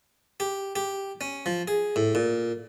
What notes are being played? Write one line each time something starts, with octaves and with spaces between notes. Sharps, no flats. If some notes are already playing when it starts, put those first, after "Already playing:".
G4
G4
C#4
F3
G#4
A2
A#2